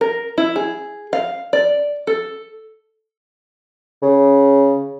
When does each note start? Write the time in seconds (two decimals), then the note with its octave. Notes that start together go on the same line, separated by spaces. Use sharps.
0.01 A#4
0.38 E4
0.56 G#4
1.13 F5
1.53 D5
2.07 A4
4.02 C#3